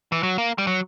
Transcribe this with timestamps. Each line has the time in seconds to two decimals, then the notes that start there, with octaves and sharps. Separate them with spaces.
0.12 E3
0.23 F#3
0.38 A#3
0.58 G3
0.67 F#3